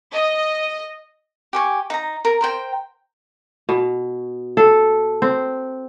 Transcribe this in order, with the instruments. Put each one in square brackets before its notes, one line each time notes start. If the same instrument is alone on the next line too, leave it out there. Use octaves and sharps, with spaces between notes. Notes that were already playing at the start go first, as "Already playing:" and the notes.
[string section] D#5
[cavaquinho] G4 G#5 C#6
D#4 A#5
A#4
A#4 C5 G5
[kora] B2
A4
C4